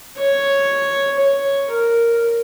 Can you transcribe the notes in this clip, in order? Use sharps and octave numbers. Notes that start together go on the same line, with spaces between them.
C#5
C#5
A#4